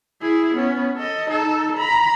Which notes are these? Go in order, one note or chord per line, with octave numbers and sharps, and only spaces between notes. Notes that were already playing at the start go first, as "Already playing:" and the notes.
E4 G#4
B3 C#4
A4 D#5
D#4 A4
A#5 B5